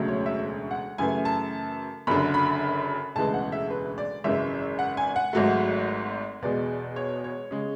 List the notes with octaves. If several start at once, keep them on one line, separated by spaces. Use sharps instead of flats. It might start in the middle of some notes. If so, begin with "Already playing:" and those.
Already playing: E1 D2 C#3 F#3 A3
C#5
E5
F#5
F#2 C#3 E3 A3 G#5
A5
F#1 F#2 D3 B5
B5
E1 D2 C#3 E3 G#3 A5
F#5
E5
B4
D5
G#1 F#2 C#3 E3 G#3 E5
F#5
G#5
F#5
G#1 G#2 F#3 A3
E2 B2 G#3 D5
C#5
C#5
C#3 G#3